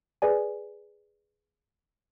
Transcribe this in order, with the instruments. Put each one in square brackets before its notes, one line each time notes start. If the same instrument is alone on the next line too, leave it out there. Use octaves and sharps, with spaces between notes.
[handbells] G#4 B4 D5 G#5